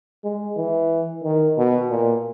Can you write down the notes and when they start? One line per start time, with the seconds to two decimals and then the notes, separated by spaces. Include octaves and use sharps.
0.24 G#3
0.57 E3
1.24 D#3
1.57 B2
1.90 A#2